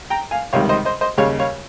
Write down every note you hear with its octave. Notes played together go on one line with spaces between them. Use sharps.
G5 A#5
F5 G#5
C#2 C3 D#3 G3 C#5 F5
C5 D#5
C5 D#5
C5 D#5
D#2 C#3 G3 C#5 F5
C#5 F5